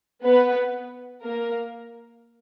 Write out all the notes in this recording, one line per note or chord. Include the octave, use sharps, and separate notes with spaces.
B3 B4
A#3 A#4